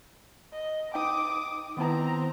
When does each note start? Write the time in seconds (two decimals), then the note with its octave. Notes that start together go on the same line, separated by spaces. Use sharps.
0.53 D#5
0.94 D#4 G5 D6 D#6
1.77 D#3 B3 C4 E4 A#5